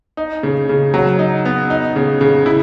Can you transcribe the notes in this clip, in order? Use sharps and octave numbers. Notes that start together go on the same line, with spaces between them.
D#4
C#3
C#3
F#3
D#4
B3
D#4
C#3
C#3
E4